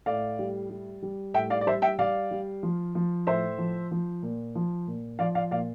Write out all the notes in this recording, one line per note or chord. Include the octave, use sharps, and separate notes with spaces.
A2 D5 F5
G3
G3
G3
A2 E5 G5
D5 F5
D5
G3 C5 E5
E5 G5
G3 D5 F5
G3
F3
F3
A2 C5 E5
F3
F3
A#2
F3
A#2
F3 D5 F5
D5 F5
A#2 D5 F5